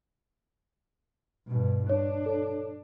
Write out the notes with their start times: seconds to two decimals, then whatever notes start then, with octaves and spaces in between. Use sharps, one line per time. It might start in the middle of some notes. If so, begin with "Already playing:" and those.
1.47 G2 B2
1.90 D4 C#5
2.26 A4 C#5